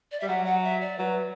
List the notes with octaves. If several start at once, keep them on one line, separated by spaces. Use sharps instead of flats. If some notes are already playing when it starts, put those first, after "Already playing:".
D5
G3 E5
F#3 F#5
F#5
E5
D5
F#3 B4